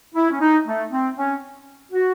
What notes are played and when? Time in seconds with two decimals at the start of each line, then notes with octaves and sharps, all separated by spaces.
0.15 E4
0.31 C#4
0.41 D#4
0.67 A3
0.92 C4
1.17 C#4
1.92 F#4